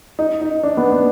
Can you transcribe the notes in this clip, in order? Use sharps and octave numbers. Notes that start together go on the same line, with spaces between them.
D#4
D#4
D4
B3
B3